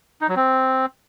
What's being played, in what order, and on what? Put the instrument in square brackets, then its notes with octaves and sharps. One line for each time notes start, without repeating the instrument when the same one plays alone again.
[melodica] D#4
F#3
C4